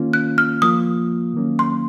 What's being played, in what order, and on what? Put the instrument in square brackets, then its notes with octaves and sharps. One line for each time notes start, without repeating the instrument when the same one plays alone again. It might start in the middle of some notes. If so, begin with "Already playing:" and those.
Already playing: [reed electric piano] D#3 A#3 C#4 F4
[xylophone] F#6
F6
[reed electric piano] F3 A#3 F4 [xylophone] D#6
[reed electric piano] D#3 F#3 A#3 C#4
[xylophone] C6